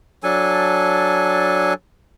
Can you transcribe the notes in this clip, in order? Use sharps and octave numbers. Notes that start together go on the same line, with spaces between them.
F#3 D4 A4 G#5